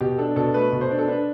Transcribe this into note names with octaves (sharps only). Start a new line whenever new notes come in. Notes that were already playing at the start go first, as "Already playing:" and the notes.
B2 G4
D4 A4
B2 A4
A3 B4
B2
C5
D4
A4
D4 B4